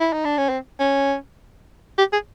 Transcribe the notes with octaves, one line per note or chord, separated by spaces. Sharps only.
E4
D#4
D4
C#4
C4
C#4
G4
G#4